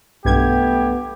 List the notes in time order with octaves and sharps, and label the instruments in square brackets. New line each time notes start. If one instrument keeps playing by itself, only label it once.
[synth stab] B1 G2 G#6 [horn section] A3 B3 G4